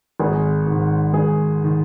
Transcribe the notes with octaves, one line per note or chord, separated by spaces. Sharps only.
G#1 G#4
G#2
D#3
G#1 G#4
D#3